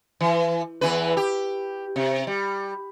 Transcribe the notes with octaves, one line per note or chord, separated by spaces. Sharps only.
E3
E2 E3 B4
G4
C3
G3